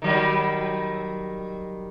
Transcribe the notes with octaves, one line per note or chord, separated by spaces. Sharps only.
D#3 F#3 G3